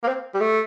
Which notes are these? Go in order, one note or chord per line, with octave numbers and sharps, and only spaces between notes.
A#3
C4
G3
A3